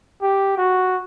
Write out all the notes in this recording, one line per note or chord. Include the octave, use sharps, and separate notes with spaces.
G4
F#4